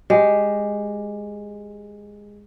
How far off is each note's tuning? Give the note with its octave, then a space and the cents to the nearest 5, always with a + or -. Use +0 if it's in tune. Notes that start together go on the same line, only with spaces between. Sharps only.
G#3 -10 G4 +0